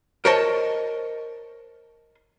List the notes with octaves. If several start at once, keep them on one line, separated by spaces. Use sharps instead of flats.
A#4 C5 C#5 D#5 A5